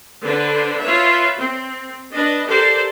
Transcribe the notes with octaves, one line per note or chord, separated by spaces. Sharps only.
D3 D4 B4 C5
F4 B4 C#5 E5
C4
D4 B4 D#5
G4 A4 A#4 C5 D5